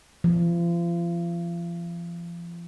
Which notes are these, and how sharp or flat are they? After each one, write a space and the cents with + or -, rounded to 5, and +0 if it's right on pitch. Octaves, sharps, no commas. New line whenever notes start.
F3 -35